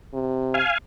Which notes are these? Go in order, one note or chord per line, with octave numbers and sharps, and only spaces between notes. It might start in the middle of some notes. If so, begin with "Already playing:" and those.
C3
F5 G#5